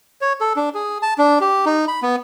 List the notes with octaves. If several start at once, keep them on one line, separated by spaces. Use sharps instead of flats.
C#5
A4
D4
G#4
A5
D4
G4
D#4
B5
B3